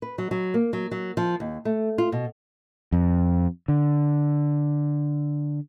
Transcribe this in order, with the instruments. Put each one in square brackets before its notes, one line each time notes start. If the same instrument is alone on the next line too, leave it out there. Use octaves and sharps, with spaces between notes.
[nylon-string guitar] B4
F#3
F#3
A#3
F#3
F#3
F3
D#2
A3
F4
B2
[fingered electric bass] F2
D3